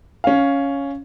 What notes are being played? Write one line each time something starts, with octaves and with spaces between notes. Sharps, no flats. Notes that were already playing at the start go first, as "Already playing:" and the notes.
C#4 F5